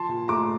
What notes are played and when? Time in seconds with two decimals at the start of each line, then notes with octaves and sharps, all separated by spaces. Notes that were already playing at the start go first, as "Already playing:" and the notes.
Already playing: F3 A5 C6
0.09 A#2
0.28 A3 A#5 D6